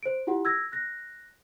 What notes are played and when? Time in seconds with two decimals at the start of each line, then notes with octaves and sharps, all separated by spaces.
0.03 C5 D7
0.27 E4 F4 G4 F#5
0.45 E6 G#6 A#6
0.72 F#6 A#6